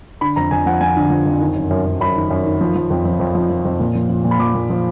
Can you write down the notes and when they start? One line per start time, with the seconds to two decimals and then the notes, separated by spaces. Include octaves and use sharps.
0.21 D3 B5
0.36 F2 A#5
0.51 F2 G#5
0.66 F3 F#5
0.81 F3 G#5
0.97 D3
1.10 F3
1.26 F2
1.41 D#3
1.55 F#2
1.71 F#2
1.86 F#2
2.00 F#2 B5
2.16 D#3
2.30 F#2
2.45 D#3
2.61 F3
2.76 F3
2.90 F2
3.05 F3
3.19 F2
3.35 F3
3.50 F3
3.65 F2
3.80 A#2
3.95 F3
4.09 F3
4.24 A#2
4.31 B5
4.39 F3 D6
4.55 A#2
4.70 F3